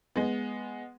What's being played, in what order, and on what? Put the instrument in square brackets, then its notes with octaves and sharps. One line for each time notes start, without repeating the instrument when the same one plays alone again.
[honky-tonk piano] G#3 B3